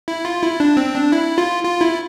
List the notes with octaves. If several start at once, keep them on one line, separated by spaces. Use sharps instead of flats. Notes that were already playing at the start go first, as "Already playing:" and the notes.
E4
F4
E4
D4
C4
D4
E4
F4
F4
E4